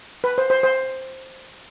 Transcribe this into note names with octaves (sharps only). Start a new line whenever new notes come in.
B4
C5
C5
C5